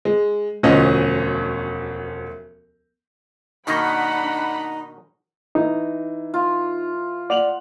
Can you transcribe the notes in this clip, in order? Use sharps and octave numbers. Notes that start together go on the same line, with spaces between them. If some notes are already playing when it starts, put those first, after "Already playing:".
G#3
E1 D2 F3 C#4 D#5
B2 D#3 A#3 D4 D#4 F#5 B5
E3 D#4
F4
D5 F#5 F7 F#7